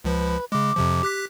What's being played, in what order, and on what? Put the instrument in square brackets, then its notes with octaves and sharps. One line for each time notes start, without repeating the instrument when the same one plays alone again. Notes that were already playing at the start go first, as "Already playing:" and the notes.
[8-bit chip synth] C#2 F3 [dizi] B4
[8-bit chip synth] C#3 G#3 [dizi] D6
[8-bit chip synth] F2 C3 F3
G4 F#6 B6